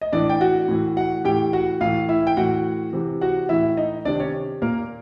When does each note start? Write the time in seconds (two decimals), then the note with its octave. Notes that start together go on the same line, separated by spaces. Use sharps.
0.01 D#5
0.12 A2 E3 D4 D5
0.29 G5
0.41 F#4 F#5
0.68 A2 E3
0.96 F#4 F#5
1.25 A2 E3 G4 G5
1.53 F#4 F#5
1.81 A2 E3 F4 F5
2.09 E4 E5
2.27 G5
2.37 A2 E3 F#4 F#5
2.93 C3 E3
3.21 F#4 F#5
3.49 A2 E3 E4 E5
3.77 D#4 D#5
4.05 C3 D#3 D4 D5
4.20 C#4 C#5
4.62 A#2 A#3 A#4